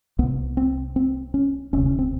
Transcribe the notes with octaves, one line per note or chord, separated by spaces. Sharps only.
C2 C3 B3
C4
C4
C#4
E1 D2 C3 C#4
C#4
C4